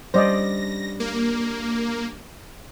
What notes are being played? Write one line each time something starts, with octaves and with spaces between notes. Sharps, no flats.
G3 C#4 D4 C5 D5 D#5 A#6
A#3